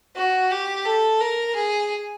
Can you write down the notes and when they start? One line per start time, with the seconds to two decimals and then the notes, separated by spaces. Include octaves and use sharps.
0.16 F#4
0.51 G4
0.85 A4
1.21 A#4
1.55 G#4